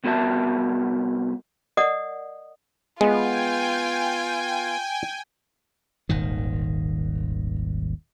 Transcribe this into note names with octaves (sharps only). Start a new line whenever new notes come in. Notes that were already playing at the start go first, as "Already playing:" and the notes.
C2 B3 F#4 A#4 E5 A5
A#4 D5 D#5 F#5 D#6
G#3 B3 F4 G5 G#5
D#1 G#1 D#3